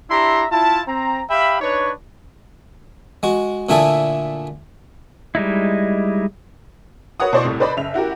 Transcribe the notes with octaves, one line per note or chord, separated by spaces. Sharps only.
D4 E4 G4 E5 A#5 C6
E4 F4 A5
C4 A#5
G4 E5 F5 G5 B5
D4 D#4 B4 C#5
G#3 F#4
A#2 D3 A3 E4 G#4 A4
G3 G#3 D#4 E4
F#4 A#4 B4 C#5 F#5 D#6
B2 E4 C5 D5 C6 C#6
C2 A2 C3
A4 B4 C5 D5 D#5 B5
F#1 E5 F7
E4 F#4 G4 A#4